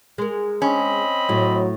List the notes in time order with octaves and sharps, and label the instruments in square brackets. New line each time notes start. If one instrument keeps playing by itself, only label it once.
[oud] G#3 A#4
[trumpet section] C4 D#5 B5 [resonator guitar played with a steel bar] C#4
[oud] A2 E4 [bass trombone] F#3